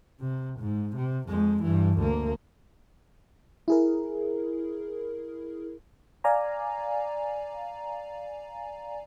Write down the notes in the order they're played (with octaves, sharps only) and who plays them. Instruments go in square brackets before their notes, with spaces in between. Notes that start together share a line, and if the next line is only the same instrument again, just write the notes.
[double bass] C3
G#2
C3
F2 G#3
G2 E3
D2 A#3
[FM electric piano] E4 G#4 A#4
D5 F5 G#5 A#5